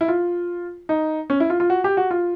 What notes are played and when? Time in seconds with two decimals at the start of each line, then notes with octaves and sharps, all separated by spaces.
0.01 E4
0.08 F4
0.89 D#4
1.30 C#4
1.40 E4
1.50 F4
1.60 F4
1.70 F#4
1.84 G4
1.97 F#4
2.11 F4